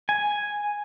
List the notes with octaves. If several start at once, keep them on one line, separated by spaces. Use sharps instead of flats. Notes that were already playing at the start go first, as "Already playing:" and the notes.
G#5